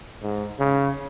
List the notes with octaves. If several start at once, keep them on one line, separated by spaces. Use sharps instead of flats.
G#2
C#3